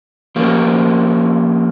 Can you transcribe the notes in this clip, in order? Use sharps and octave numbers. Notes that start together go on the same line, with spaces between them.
F3 A#3 C#4 G4